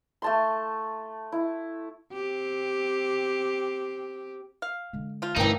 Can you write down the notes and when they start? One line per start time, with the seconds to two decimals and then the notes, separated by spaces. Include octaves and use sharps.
0.22 A3 A5 C6
1.32 E4
2.13 C4 G4
4.62 F5
4.93 D3 G#3
5.22 F3 F4
5.36 D2 G2 E3 A#3 C#4 D#4 G5